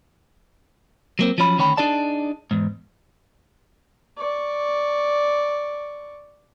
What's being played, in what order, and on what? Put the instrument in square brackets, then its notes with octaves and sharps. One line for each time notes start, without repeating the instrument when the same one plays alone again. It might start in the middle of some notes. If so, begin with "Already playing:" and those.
[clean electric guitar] F#3 A#3 C4
F3 F#3 C#4 B5
D2 D#3 C#4 C#5 G5 B5
D4 D#4 G#4 D5 A5
E2 G#2
[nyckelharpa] D5 C#6